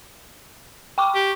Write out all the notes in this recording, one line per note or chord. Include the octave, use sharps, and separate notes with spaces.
G5 C#6 D6
G4